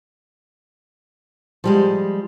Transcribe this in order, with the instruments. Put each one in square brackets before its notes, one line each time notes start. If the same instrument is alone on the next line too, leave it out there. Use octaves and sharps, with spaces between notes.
[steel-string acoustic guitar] F3 G3 G#3